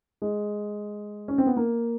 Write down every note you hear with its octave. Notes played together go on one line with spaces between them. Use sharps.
G#3
C#4
C4
B3
A#3